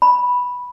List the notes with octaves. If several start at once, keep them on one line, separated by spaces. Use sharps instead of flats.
B5